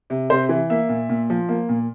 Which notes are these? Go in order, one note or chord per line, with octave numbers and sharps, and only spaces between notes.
C3
C3 C5
E3
A#3 E5
A#2
A#2
F3
A#3
A#2